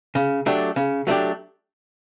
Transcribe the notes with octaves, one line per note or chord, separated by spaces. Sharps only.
C#3
F#3 A3 D4 G4
C#3
F#3 A3 D4 G4